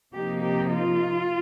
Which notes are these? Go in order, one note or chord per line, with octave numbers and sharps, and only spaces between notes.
C3 F3 A#3 D#4 G4
G4
F4